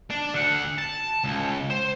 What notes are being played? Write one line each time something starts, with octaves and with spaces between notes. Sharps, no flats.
D4
D2 F#5
A5
C#2
C5